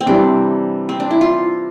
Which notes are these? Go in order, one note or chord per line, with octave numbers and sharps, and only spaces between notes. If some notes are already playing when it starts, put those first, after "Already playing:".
C4
C3 E3 G3 D4
C4
D4
E4
F4